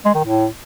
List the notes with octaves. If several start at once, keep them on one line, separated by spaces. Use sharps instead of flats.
G#3
D#3
A2